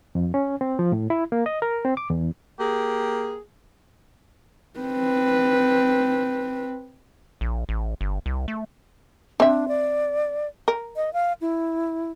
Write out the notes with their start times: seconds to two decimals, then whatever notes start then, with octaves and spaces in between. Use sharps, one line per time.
0.15 F2
0.34 C#4
0.61 C4
0.79 F3
0.92 A2
1.10 E4
1.32 A#3
1.46 D#5
1.62 A#4
1.85 C4
1.97 D6
2.10 E2
2.59 A#3 G4 G#4
4.79 C4 B4
7.41 A#1
7.69 A1
8.01 G1
8.26 C2
8.48 A3
9.40 C4 D4 E5
9.68 D5
10.68 A#4
10.96 D#5
11.13 F5
11.41 E4